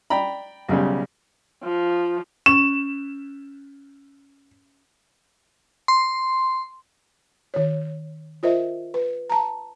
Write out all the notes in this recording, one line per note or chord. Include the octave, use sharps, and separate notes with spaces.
D5 G5 A#5 B5
B1 C#3 G3
F3
C#4 E7
C6
D#3 C#5
F4 A#4 C5 D#5 E5
B4
A5 A#5